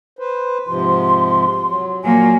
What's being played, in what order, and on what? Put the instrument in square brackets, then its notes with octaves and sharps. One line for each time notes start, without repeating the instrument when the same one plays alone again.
[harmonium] B4 C5
[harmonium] G#2 C3 F3 [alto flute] C6
[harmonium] F#3
[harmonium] A#2 [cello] F#3 A#3 [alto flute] G#5